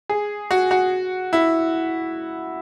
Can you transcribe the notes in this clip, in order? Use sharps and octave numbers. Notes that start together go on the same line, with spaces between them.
G#4
F#4
F#4
E4